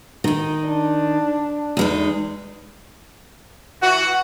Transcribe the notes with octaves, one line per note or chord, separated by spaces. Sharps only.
D#3 D#4
D4
E2 G#3 D#4
E3 F#4 F#5